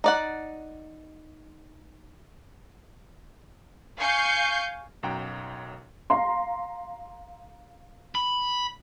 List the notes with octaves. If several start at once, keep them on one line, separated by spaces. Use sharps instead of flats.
D#4 D5 F#5
F5 G#5 C#6 G6 C7 C#7
B1 F#2 F#5 G5 A#5
F5 A#5 C6
B5